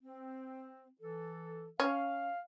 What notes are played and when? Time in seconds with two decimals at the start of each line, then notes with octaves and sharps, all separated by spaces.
0.03 C4
1.00 E3 A4
1.80 C#4 F5